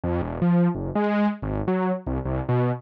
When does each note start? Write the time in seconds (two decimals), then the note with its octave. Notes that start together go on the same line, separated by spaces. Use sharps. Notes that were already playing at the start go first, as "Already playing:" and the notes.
0.04 F2
0.22 E1
0.42 F3
0.75 F#1
0.95 G#3
1.42 G#1
1.68 F#3
2.07 C2
2.25 C2
2.49 B2